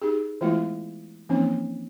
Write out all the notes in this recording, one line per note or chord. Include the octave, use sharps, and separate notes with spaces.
D#4 G4 G#4
E3 G#3 A3 B3 E4 F4
E3 F3 A#3 C4 C#4 D#4